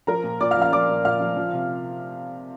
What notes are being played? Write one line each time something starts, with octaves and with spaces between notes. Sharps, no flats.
F3 A#4 A#5
A#2
A#2 D5 D6
F5 F6
F3
F5 F6
F3 D5 D6
A#2
A#2 F5 F6
F3
F3
C3